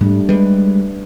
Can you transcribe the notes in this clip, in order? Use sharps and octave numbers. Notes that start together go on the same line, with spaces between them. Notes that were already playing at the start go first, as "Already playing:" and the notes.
G#2 G3 A3 D4
G3 G#3 B4